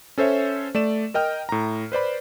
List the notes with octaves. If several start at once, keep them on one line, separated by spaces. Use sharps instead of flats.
C#4 A4 C5 C#5 E5
A3 D5 E7
A#4 D#5 G5 F6
A2 A#5
B4 C5 D5 B5